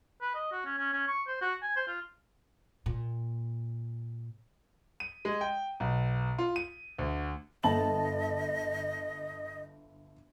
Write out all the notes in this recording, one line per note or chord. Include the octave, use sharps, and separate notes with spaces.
B4
D#5
F#4
C#4
C#4
C#4
C#6
C5
F#4
G#5
C5
F4
A#2
D#7
G#3
G5
B1
F4
D#7
D2
G1 D#5 A5 F#7